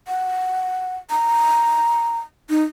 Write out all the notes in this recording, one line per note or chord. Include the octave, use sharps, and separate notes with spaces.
F#5
A#5
D#4